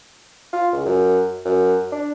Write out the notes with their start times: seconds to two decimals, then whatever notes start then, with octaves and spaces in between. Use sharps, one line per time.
0.53 F4
0.73 C#2
0.86 F#2
1.45 F#2
1.92 D4